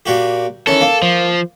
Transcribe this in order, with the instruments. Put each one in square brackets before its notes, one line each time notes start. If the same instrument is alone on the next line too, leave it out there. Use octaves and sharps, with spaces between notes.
[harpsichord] A#2 F#4 G4
[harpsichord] D#3 E3 C#4 [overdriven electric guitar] A4
[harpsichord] A#3
[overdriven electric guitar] F3